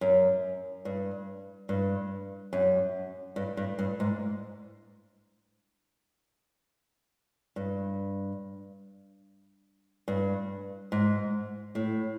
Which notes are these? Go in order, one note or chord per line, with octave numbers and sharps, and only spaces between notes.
F#2
G2
G2
F#2
G2
G2
G2
G#2
G2
G2
G#2
A2